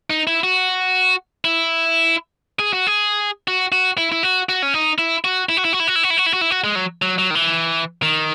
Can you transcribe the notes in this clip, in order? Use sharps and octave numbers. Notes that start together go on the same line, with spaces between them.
D#4
E4
F#4
E4
G#4
F#4
G#4
F#4
F#4
E4
E4
F#4
F#4
C#4
D#4
E4
F#4
E4
F#4
E4
F#4
E4
F#4
E4
F#4
E4
F#4
E4
F#4
E4
F#4
G#3
F#3
F#3
F#3
D#3
E3
D#3